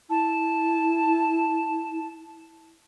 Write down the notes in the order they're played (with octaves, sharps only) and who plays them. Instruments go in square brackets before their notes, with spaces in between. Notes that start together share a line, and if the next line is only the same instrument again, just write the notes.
[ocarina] E4 [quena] A5